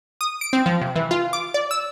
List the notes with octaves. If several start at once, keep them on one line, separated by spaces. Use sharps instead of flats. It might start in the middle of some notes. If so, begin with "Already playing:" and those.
D#6
D7
C4
F3
C3
E3
F4
D6
D5
E6